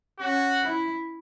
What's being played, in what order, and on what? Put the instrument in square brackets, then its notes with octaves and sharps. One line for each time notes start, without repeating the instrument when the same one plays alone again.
[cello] C#4 [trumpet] F#4
[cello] E4